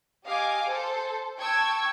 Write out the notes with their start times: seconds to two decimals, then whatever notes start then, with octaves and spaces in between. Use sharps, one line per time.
0.25 G4 D#5 F5 G#5 D6
0.66 A4 C5
1.39 G5 A5 C#6 E6 G#6